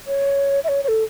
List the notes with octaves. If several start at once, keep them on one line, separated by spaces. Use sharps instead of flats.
C#5
E5
C#5
C#5
A4